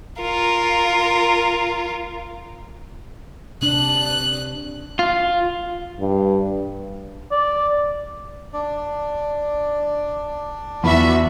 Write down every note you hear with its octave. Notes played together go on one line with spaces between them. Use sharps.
F4 A#4
C3 D4 F#6
F4
G2
D5
D4 D5
E2 F4 F#4 E5 B5